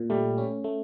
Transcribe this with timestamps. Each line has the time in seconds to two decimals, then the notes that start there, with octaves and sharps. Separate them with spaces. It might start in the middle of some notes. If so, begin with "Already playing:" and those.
Already playing: A#2
0.10 G3 A3
0.38 C#4
0.64 A3